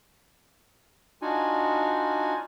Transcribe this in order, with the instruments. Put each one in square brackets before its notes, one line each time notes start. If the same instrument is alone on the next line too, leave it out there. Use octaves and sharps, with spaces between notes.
[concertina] D4 D#4 F4 F#4 G#5